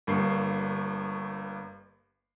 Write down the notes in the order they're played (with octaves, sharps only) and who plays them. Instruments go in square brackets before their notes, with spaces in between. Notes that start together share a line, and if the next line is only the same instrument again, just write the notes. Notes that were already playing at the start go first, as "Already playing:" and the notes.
[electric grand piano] G1 G2 A#3 C#6 C7